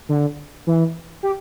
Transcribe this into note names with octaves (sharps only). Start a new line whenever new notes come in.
D3
E3
G4